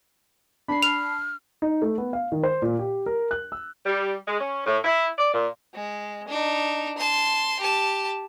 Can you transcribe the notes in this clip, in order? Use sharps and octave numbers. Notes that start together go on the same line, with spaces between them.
D4 B5 C7
F6 F7
D#4
A3
B3
F5
D#3
C5
A#2
G4
A#4
F#6
E6
G3
G#3
C#4
A2
E4
D5
A#2
G#3
D4 D#4
A5 C6
G4 A5